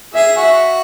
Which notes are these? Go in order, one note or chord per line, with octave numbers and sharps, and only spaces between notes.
G#4 E5
F#4